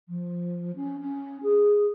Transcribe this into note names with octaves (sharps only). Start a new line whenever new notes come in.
F3
C#4
C#4
G#4